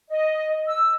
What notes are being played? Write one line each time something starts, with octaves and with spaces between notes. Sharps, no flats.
D#5
E6